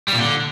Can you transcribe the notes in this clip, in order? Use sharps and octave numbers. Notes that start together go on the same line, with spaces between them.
G3
A#2
D3